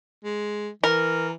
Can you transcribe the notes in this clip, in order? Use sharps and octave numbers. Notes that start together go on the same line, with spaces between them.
G#3
E3 A#4